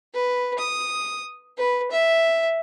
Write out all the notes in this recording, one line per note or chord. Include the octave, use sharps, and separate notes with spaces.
B4
D#6
B4
E5